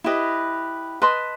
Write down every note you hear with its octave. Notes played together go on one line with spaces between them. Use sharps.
E4 G4 B4 D#5
B4 D#5 A5 C6